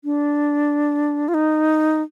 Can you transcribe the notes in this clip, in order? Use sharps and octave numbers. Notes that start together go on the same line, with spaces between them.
D4
F4
D#4